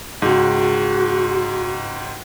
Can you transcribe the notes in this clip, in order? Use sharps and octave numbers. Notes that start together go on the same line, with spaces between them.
C#2 G#2 F#4